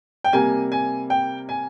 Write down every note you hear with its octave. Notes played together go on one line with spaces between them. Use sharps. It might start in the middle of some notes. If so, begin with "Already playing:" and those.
G5
C3 G3 A#3 G#5
G#5
G5
G#5